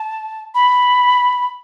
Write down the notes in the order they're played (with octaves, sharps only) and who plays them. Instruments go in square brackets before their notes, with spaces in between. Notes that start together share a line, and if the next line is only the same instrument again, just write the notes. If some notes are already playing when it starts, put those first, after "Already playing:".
Already playing: [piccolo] A5
B5